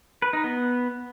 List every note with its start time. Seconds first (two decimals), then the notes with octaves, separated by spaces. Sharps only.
0.22 B4
0.33 D#4
0.44 B3